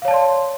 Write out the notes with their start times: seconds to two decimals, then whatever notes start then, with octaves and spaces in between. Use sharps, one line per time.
0.02 F5
0.05 C#5
0.08 A5
0.11 D5
0.14 C6